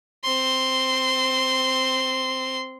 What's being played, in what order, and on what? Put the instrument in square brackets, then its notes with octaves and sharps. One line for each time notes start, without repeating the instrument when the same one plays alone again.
[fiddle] C4 C6